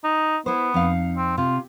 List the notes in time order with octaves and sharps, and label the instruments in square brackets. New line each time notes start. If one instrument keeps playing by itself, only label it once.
[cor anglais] D#4
[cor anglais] B3 [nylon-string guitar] E4 C5
[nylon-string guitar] F2 D#4 F5
[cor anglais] C4
[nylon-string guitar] C3 [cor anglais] F4